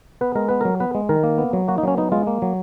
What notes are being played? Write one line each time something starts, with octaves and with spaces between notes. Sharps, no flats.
B3 B4
G#3 A#4
B3 B4
F#3 A#4
B3 B4
G#3
D#3 A#4
A#3
B3
F#3
A#3 F#4
D#4
F#3 C#4
B3 D#4
G#3 F4
A#3
F#3